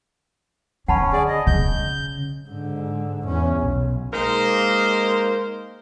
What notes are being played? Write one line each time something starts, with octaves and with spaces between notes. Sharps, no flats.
D3 C#4 F#5 A5 B5
G#4 D5
D#5
C#3 G6
G#2 D3
E2 C#4
B1
G#3 A#3 D#4 A#4 C5